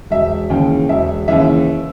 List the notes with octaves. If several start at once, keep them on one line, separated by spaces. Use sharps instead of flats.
E1 E5
D#2 C#3 E3 G5
E1 E5
D#2 C#3 E3 E5